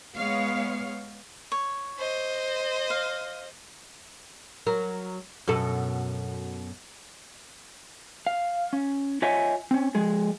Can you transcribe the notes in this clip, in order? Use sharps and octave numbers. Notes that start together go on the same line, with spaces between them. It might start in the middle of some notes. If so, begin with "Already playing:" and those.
G#3 B3 C#5 F5
C#5
C5 D#5
F5
F#3 A#4
F#2 B2 A4
F5
C#4
F4 C#5 D#5 E5 F#5 G#5
C4 C#4
F3 G#3 G#4